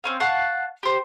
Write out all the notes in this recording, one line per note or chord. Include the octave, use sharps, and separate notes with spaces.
C4 C#4 F5
F5 F#5 A5 C#6
G4 C5